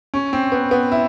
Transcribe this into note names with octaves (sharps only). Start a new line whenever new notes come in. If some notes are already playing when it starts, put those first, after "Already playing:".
C#4
C4
B3
B3
E4